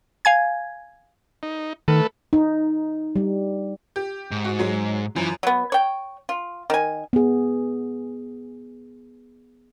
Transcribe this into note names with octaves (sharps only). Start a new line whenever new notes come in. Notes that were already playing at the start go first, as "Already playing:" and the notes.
F5 G#5 G#6
D#4
D#3 A3 A4 B4
D#4
G3
G4
G#2
F#4
F#3 G#3
F#2 E3 F3
F#3 B3
C#5 G5
F4
D#3 G#5
B3 G#4